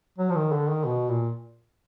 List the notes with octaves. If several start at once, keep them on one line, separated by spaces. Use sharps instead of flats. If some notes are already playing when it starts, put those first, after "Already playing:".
F#3
F3
D#3
D3
D#3
B2
A#2